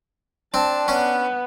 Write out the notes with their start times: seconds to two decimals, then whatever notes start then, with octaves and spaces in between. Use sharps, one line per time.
0.54 C4 D4 A5
0.88 B3 C#4